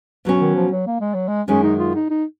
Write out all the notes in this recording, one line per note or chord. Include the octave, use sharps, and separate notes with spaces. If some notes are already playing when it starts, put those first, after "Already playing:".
B2 F#3 C#4
D#3
F3
F#3
A#3
G#3
F#3
G#3
F#2 D#3 G#3 C#4
D#4
F4
D#4
D#4